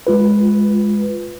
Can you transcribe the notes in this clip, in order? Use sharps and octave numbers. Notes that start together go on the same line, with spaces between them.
G#3 F4 B4